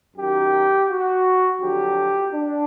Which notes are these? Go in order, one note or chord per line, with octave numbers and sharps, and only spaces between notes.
F#2 D#3 F#3 G4
F#4
F2 D3 F#3 G4
D4